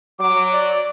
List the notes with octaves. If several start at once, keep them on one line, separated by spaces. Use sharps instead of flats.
F#3 D6
D5